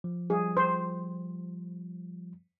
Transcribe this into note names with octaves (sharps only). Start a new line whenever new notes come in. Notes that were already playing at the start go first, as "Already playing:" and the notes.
F3
F3 G3 G#4
C5